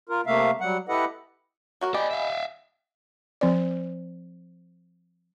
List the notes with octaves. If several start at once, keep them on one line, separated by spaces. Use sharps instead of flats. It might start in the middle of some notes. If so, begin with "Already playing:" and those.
F4 A#4
C3 A3 A#3 E5 F5
F#3 G3 F#5
E4 G4 A4 B4 D#5 F#5
F#3 F#4 A#4
B3 G4 D5 D#5 G#5 B5
E5 F5
F3 C4 C5 D5